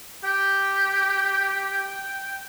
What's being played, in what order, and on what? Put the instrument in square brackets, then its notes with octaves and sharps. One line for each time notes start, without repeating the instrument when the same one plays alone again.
[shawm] G4 [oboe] G5